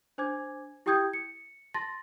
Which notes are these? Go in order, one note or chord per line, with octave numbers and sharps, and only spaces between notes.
D4 C5 G#5 D6 G#6
E4 G4 G5 D#6 G6 G#6
C#7
A5 C6 A6 A#6